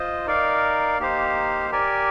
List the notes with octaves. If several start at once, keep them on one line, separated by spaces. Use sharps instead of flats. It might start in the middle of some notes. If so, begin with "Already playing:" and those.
Already playing: F4 C5 D#5
D#4 A#4 D5 F5
A#3 D#4 G4 C5 F5
G4 A#4 D5 G#5